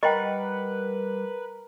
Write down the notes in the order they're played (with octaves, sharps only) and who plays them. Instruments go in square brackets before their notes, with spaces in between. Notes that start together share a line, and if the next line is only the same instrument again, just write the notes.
[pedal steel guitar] G3 F#5 C#6 [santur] A#4 [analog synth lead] B4 [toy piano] D#5 G5